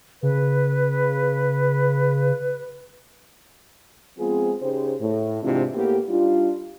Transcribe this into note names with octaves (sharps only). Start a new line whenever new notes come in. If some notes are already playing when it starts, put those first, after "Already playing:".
C#3 B4
F3 G#3 B3 C4 F4 G#4
C#3 D#4 G4 G#4 C5
A2
G#2 C3 E3 C4 D4 F4
A2 A#3 B3 G4
G3 D4 D#4 F4